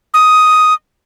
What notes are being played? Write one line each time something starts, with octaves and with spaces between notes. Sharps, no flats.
D#6